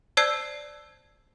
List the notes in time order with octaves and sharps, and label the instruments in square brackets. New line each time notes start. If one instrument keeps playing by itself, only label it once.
[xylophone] C5 D5 A5 E6 G#6 C7